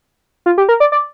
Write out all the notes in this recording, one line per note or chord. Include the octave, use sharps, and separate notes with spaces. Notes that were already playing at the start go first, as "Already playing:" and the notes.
F4
G4
A#4
D5
D5